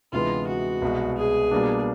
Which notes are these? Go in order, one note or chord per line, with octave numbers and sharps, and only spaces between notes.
D2 C3 E3 G#3 B3 F4
F#4
C2 B2 G#3
G#4
B2 G3 A#3 D4